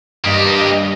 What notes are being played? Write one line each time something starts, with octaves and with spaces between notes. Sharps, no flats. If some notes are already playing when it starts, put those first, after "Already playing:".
G2 A#3 G4 D#5